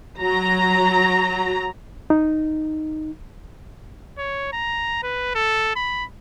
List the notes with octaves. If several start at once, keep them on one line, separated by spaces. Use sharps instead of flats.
F#3 A#5
D#4
C#5
A#5
B4
A4
B5